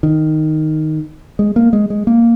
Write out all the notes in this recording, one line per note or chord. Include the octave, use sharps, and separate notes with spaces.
D#3
G#3
A#3
G#3
G#3
A#3